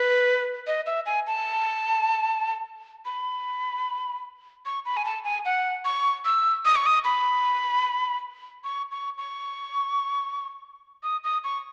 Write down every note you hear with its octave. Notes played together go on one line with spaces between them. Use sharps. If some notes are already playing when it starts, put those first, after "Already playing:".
Already playing: B4
D#5
E5
G#5
A5
B5
C#6
B5
G#5
A5
G#5
F#5
C#6
E6
D#6
C#6
D#6
B5
C#6
C#6
C#6
D#6
D#6
C#6